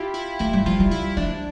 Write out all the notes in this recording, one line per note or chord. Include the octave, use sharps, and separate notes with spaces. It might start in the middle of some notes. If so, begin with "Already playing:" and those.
Already playing: E4 F4 G4
E4
A3 E4
G3
F3 F4
G3
E4
F3 D4